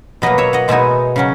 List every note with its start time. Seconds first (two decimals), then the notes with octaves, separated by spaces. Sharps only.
0.22 B2 F#3 A#3 B4 D#5
0.38 C#5 E5
0.53 D#5 F#5
0.68 B2 G#3 B3 D#4 E5 G#5
1.16 C#3 F#3 C#4